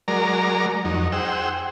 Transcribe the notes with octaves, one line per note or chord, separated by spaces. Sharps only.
F#3 G#3 A#4 D5 A#5
F2 F#3 D#4
G#4 C5 F#5 G5 E6